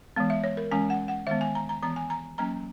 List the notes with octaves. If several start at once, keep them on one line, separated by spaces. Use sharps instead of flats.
E3 G#3 B3
E5
C#5
A#4
E3 G#3 C#4 G#5
F#5
F#5
D#3 G#3 B3 E5
G#5
A#5
A#5
E3 B3 A#5
G#5
A#5
F#3 A#3 C#4 A#5